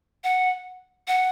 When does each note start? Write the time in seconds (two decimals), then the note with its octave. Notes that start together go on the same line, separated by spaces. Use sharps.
0.24 F#5
1.08 F#5